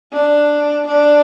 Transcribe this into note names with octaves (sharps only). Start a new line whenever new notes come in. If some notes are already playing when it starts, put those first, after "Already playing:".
D4
D4